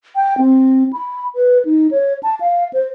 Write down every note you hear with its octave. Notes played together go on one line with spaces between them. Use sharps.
G5
C4
B5
B4
D#4
C#5
A5
F5
C5